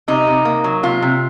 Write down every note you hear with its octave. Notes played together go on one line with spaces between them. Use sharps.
C3 D#4
C3
A#3
F#3
C3 F4
C3